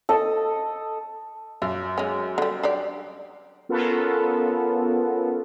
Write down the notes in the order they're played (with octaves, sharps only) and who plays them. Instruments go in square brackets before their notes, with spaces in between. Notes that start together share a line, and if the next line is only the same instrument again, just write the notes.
[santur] A4 D#5
[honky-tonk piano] F#2 [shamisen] F4
[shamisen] G#3 C#4
D3 G3
D4 G4 D5
[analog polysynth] B3 C#4 F4 A4 A#4